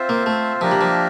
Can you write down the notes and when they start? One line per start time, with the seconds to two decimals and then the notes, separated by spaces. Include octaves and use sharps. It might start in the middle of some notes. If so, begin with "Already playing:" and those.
Already playing: C4 F4 C5 E5
0.09 A#3
0.26 A3
0.61 F3 A#3 D4 G4 A#4 E5
0.71 G3
0.81 F3